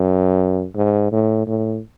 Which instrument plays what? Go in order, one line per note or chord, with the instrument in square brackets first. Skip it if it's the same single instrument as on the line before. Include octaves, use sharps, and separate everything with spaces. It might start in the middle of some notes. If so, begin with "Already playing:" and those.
Already playing: [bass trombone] F#2
G#2
A2
A2